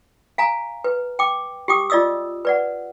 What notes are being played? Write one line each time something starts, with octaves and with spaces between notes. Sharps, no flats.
F5 G#5 A#5
B4
G5 D6
G4 G5 D6 D#6
F4 D5 D#5 D#6 E6
B4 D5 F#5